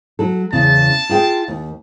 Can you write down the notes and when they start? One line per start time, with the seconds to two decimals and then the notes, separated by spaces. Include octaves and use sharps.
0.19 F#3 A4
0.52 E2 C#3 A5
1.09 F4 G#4 G5
1.48 D#2